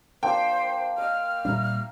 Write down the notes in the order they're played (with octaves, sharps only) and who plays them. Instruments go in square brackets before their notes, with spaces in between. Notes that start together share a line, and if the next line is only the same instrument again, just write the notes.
[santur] A#3 D4 F4 [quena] C5 [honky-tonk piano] G5
[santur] D#5 [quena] F6
[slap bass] A#2 G3 D4 [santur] E5 A#5